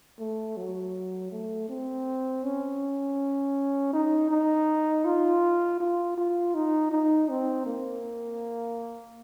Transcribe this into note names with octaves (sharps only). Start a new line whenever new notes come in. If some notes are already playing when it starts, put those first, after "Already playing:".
A3
F#3
A3
C4
C#4
D#4
D#4
F4
F4
F4
D#4
D#4
C4
A#3